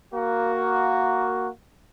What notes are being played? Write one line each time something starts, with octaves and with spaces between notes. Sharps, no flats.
A#3 F#4